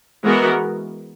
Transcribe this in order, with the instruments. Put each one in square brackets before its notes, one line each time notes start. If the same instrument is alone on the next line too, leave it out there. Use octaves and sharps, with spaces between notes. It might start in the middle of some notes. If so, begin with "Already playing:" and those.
[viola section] E3 G#3 B3 F#4 A#4